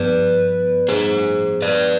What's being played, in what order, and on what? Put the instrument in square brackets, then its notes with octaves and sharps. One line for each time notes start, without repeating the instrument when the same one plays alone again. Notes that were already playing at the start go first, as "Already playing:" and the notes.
Already playing: [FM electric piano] G2 F3 B3 [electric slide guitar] B4 D5
[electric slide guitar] G#4 C5
B4 D5